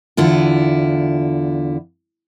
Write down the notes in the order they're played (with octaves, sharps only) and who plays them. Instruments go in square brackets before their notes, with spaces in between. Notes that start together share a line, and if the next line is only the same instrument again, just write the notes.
[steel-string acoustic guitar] E2 D3 E4 F4